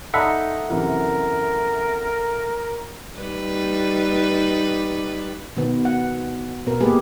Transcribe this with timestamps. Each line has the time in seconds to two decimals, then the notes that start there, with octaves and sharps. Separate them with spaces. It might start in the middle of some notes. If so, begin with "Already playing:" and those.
0.14 D#4 A4 D5 E5 F#5 A#5 C6
0.70 F#2 C3 E3 A#4
3.19 G3 D#4 B4
5.57 B2 D#3 B3
5.85 F#5
6.66 B2 B3 A#4
6.81 G#3 A#3 G4 G#4 B4